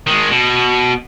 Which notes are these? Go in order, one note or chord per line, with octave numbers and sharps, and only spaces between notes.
D#3 G#3
B2